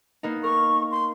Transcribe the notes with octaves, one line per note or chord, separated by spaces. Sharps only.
A#3 B3 D#4
A#4 C#6
C6